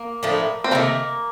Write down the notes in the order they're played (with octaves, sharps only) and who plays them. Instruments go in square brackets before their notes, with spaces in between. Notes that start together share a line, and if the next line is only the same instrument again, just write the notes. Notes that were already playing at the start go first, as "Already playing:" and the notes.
Already playing: [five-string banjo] A#3
[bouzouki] A2 F3 A3 D4
[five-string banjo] C4
[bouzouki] C3 D#3 A3 [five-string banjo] A#3